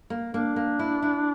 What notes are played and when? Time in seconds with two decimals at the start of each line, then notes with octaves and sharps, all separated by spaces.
0.10 A#3
0.33 A#3 D4
0.56 A#3
0.79 E4
1.02 E4